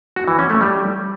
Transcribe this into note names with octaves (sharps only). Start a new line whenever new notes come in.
F#4
E3
C#4
A3
G3